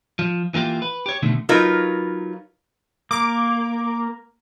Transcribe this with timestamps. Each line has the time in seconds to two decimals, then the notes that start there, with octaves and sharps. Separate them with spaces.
0.19 F3
0.54 E3 A#3 F4 G4
0.82 B4
1.06 G4 C#5
1.22 B2 D3 D#3 A3
1.49 F#3 D#4 F4 A#4 B4
3.11 A#3 D6